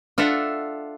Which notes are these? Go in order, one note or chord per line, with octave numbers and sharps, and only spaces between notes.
D4 F4 A4 E5 F#5